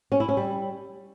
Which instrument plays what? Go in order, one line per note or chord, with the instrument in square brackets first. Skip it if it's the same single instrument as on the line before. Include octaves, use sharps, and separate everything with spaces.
[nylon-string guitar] C#4
E4
C#4
G3